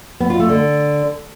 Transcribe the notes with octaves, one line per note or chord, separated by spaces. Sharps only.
B3
F4
A3
D3